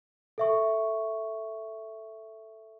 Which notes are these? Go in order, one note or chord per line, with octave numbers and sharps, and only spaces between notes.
A4 E5 C#6